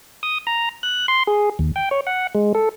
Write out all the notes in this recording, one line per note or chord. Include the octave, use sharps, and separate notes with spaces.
D#6
A#5
F#6
C6
G#4
D#2
G5
C#5
F#5
G#3
A4